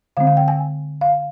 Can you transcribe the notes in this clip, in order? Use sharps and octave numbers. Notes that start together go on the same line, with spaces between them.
D3 G#3 C4 F5
F5
G5
G#5
F5